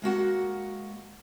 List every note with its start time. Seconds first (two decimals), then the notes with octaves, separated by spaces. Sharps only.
0.02 G#3 A#3 F#4 F#5